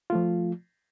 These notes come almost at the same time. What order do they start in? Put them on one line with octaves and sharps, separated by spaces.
F4 A3 F3